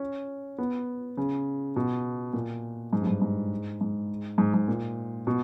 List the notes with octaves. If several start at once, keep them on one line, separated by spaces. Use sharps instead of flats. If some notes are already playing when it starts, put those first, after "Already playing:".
Already playing: C#4
B3
C#3
B2
A#2
G#2
G2
G#2
G#2
G#2
G#2
G#2
A#2
B2